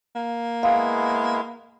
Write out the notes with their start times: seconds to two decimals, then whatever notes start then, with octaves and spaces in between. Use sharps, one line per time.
0.15 A#3
0.63 G#3 B3 E4 F5